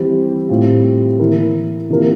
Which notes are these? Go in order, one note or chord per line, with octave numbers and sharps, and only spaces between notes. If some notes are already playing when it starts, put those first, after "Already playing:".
Already playing: E3 G3 C4 G4
A2 G3 C4 F4
E3 A#3 E4 A#4
C3 E3 A#3 F4 A#4